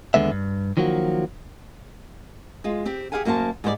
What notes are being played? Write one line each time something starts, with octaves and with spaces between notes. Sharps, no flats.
D#2 D3 G#3 B3 E5
G2
D#3 F3 F#3 A#3 F#4
G#3 F4
C4 G4
G4 G#4 C5 F5 F#5 G#5
F#2 A#3 F#4 C5 A5
G#2 G3 C5 D5